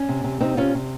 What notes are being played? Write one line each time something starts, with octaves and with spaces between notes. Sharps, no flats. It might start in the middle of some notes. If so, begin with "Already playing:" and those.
Already playing: C#4
C3
C3
C3 C4 D#4
C3 C#4 F4
C3